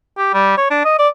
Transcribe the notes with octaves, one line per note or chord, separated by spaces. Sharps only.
G4
G3
C#5
D4
D#5
D5